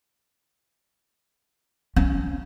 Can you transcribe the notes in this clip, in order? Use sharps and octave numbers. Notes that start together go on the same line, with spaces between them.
C#4